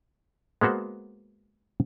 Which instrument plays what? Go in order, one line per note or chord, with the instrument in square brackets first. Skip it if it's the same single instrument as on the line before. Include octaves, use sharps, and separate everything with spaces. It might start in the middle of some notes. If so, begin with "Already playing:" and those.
[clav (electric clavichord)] G#3 A#3 B3 F#4 C5